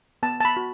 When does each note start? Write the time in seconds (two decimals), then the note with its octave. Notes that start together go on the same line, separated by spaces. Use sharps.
0.23 B3 A5
0.40 A5
0.45 B5
0.57 F#4